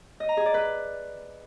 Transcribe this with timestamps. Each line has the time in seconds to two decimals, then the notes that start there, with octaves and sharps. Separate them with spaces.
0.20 D#5
0.29 A#5
0.37 G#4
0.46 D5
0.54 B4